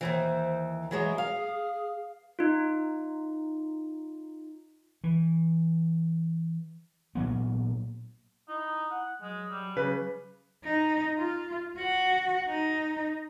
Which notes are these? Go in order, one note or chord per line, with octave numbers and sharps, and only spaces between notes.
D#2 G#2 E3 C5
E3 F#3 G#3 G#4
F5
D#4 F4
E3
A#2 F#3 B3
D#4 E4
F#5
F#3 G#3
G3
C#3 B4
D#4
F4
F#4 F#5
D#4